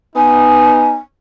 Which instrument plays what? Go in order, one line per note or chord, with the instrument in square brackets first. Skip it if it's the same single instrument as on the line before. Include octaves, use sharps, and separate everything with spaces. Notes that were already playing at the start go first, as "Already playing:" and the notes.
[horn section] B3 D#4 [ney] G#5